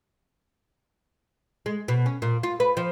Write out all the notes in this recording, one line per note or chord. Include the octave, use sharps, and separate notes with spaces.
G#3
B2
C#4
A#2
F4
B4
F3